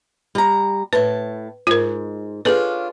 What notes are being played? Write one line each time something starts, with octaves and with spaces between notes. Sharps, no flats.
G3 A#5
A2 B4 A5
G#2 F4 A#4
C#4 D4 F4 G#4 A4 B4